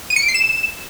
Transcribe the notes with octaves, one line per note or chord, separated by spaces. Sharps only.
D#7
C#7
D7
C7
E7